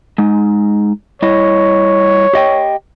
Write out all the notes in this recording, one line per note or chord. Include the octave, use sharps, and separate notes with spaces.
G#3 D#4
G3 E4 C#5 D#5
G4 D#5 G5